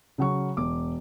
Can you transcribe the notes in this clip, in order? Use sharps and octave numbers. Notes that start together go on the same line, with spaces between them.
C#3 F#3 C#6
E1 D6